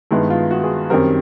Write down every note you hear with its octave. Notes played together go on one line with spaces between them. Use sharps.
G2 D#3 G#3 B3 D#4 E4
F4
F#4
G#4
F#2 D#3 G3 C4 A#4